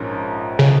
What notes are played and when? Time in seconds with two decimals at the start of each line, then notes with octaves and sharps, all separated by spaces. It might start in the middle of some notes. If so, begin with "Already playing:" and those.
Already playing: A#1 G#2 F3 C#4 A#4
0.59 C#3